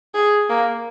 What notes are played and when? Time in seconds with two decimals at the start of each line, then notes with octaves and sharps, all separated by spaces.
0.14 G#4
0.49 A#3